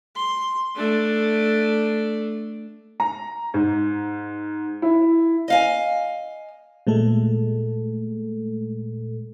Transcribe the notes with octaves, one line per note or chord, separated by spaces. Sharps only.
C6
A3 D4
A#5
G#2
E4
D#5 F5 G#5
A#2 G#3 A3 A4